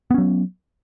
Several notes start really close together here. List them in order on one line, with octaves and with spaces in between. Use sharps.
B3 C#4 F#3